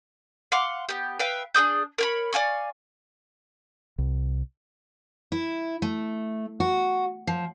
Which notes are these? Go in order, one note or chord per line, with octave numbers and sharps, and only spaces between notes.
F5 F#5 C6 D6
B3 G4
B4 E5 F5 G5
D4 G#4 D#6 G6
A#4 C#5 B5
D5 F5 G#5 C#6
C2
E4
A3
F#4
F3